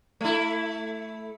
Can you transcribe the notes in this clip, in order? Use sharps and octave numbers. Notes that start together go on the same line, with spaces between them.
A3 E4